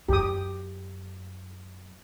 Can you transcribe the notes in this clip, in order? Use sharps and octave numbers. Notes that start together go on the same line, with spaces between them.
F#2 G4 D#6